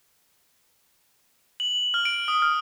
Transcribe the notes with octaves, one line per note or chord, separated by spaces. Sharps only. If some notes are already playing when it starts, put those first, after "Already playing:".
F#7
F6
D7
D#6
F6